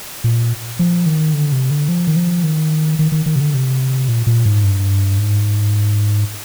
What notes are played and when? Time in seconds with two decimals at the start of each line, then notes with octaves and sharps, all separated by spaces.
0.24 A#2
0.79 F3
1.06 D#3
1.34 D3
1.52 C3
1.71 D3
1.89 F3
2.07 D#3
2.16 F3
2.43 D#3
2.99 D#3
3.12 D#3
3.26 D#3
3.36 C3
3.40 D3
3.54 C3
4.08 A#2
4.27 A#2
4.46 G#2
4.64 G2
5.18 G#2